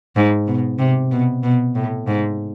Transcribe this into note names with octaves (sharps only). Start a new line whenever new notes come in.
G#2
B2
C3
B2
B2
A2
G#2